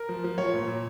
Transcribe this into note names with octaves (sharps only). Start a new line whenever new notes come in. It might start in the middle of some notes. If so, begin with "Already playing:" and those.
Already playing: A#4
F3
F3
F3 C#5
A#2
A#2